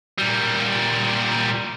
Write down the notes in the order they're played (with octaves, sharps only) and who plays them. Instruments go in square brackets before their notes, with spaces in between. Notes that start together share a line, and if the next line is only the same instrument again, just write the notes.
[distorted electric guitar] A#2 G3